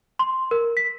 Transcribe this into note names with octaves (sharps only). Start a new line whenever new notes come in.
C6
A#4
B6